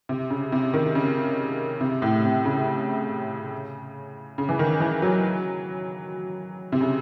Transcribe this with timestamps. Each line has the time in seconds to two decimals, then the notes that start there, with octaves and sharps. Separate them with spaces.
0.09 C3
0.30 C#3
0.52 C3
0.73 D#3
0.95 C#3
1.81 C3
2.02 A2
2.24 C3
2.45 C#3
4.38 C#3
4.49 E3
4.59 D#3
4.80 E3
5.02 F#3
6.72 C3
6.81 C#3